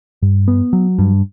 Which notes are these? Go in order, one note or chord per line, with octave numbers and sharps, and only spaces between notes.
G2
B3
F#3
G2